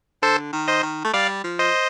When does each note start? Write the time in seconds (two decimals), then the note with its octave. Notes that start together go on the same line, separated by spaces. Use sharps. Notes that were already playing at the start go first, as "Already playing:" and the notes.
0.22 D3 A4 C5
0.53 D#3
0.68 C5 D#5
0.83 D#3
1.04 A3
1.13 G3 D5 F5
1.44 F3
1.59 C5 D#5